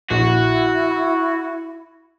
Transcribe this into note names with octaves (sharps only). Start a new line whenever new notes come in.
A#1 E4 F#4